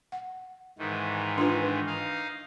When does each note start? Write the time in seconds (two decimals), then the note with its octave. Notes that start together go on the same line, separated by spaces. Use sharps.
0.12 F#5
0.78 G#2 D#3 E3
1.38 D4 F4 B4
1.86 D#4 F5